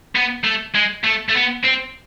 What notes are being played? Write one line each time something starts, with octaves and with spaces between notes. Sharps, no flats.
B3
A3
G#3
A3
A3
B3
C4